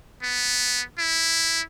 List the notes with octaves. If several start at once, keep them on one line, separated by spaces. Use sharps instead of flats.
B3
E4